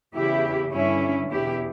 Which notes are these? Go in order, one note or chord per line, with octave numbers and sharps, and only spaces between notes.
E2 C#3 E3 E4 G4
G2 D3 C#4 E4
E2 B2 E4 G4